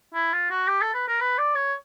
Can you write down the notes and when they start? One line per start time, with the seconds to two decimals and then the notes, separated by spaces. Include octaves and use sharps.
0.14 E4
0.33 F4
0.50 F#4
0.67 G4
0.81 A4
0.94 B4
1.08 A#4
1.20 B4
1.38 D5
1.55 C#5